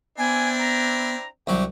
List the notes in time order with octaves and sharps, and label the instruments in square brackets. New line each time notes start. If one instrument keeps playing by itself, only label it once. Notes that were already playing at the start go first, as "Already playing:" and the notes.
[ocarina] B3 [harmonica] C4 D4 E4 [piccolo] G#5
[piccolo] A#5
[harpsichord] C2 F#3 [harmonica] G4